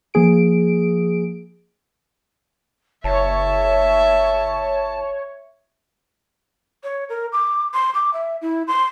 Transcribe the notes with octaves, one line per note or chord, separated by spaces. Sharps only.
F3 A#3 G#4 D7
F#1 C#5 E5 A5
C#5
A#4
D6
C6
D6
E5
E4
C6